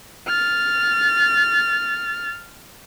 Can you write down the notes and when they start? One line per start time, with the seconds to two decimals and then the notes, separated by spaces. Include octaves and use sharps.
0.28 F6 A6